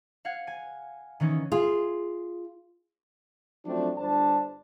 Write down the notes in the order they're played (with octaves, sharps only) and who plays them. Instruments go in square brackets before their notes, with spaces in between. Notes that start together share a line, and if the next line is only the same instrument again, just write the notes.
[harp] F5 F#5 G#6
G#5
D#3 E3 C#4 D#4
[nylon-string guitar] F4 G#4
[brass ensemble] F3 F#3 A3 C4 D4
G1 G2 D4 C5 A5